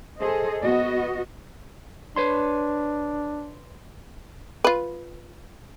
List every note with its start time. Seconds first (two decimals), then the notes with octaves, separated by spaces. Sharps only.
0.19 G#4 A4 C5 D#5
0.62 B3 F#4 D#5
2.16 D4 B4 C#5 C6
4.64 F4 B4